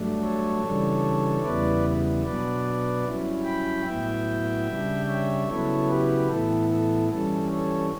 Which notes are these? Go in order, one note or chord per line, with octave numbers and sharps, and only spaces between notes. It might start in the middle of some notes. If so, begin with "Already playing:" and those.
Already playing: G2 F#3 A3 D4
A4 C#5
C#3 E3 G3 D4
E2 C#3 G3 B3 E4 B4 D5
B2 F#3 B3 D4 B4 D5
G2 F#3 C#4 E4
G5 B5
A2 F#3 B3 E4 E5 G5
C#3 G3 D4
C#5 E5
C#3 F#3 B3 E4 A4 C#5
G4 B4
A2 E3 B3 E4 A4
A4
G2 E3 G3 C#4 A4
A4 C#5